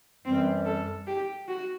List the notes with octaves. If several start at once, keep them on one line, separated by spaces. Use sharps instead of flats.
F#2 E3 G3 C4
A4
G4
F#4